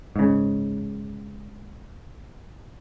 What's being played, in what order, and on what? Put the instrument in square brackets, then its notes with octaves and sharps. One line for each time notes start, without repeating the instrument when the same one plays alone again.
[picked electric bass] G#2 C#3